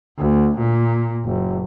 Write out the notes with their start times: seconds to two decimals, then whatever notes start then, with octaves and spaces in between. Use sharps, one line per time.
0.18 D2
0.58 A#2
1.25 F#1